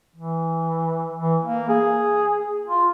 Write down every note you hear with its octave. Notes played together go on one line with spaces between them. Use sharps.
E3
E3
A#3
G#4
F4